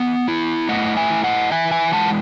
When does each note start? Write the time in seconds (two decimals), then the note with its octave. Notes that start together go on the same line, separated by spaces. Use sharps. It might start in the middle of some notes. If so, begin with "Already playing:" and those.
Already playing: B3 E5
0.28 E4
0.69 A3 D#5 F#5
0.96 E5 G#5
1.10 E4
1.24 D#5 F#5
1.52 E3 E5 G#5
1.71 E5 G#5
1.93 G#3 F#5 A5